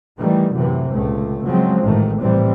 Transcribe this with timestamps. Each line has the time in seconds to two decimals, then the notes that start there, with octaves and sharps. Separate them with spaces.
0.18 D#3 E3 G3 A3
0.53 F#2 A2 C3 E3
0.90 C#2 A#2 A3
1.44 C#3 F3 F#3 G#3 C4
1.82 A1 G#2 C3 D#3 A3
2.20 A#1 A2 C3 E3 G3 C4